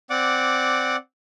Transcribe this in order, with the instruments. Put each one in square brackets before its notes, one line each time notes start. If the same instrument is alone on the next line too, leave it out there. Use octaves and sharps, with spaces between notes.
[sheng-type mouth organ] C4 D5 F#5 D6